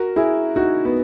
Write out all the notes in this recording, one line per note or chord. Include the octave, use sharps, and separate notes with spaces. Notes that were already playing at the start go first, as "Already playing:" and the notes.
Already playing: F#4 A#4
E4 G#4
D#4 F#4
B3